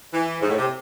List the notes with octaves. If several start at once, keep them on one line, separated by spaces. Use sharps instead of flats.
E3
G#2
A2
C3